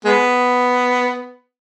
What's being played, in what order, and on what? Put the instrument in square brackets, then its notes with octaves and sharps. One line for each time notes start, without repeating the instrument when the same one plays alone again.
[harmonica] G#3 B3